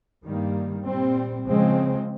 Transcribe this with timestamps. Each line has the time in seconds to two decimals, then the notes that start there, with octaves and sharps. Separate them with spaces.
0.24 G2 D#3 G3 A#3
0.86 A#2 G3 C4
1.47 C#3 F3 G#3 C4